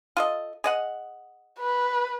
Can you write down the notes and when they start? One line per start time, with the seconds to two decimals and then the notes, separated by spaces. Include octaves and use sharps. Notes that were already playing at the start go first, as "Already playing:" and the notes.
0.17 F4 A4 D#5
0.64 G#4 D#5 F#5
1.60 B4